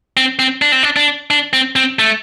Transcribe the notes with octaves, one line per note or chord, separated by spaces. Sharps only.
C4
C4
D4
C4
D4
D4
D4
C4
C4
A3